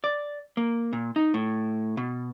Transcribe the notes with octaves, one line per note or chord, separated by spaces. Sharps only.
D5
A#3
A#2
D#4
A2
B2